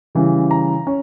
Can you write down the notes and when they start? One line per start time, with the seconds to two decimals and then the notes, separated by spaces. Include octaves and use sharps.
0.15 C#3 E3 G3
0.51 A#5
0.87 C#4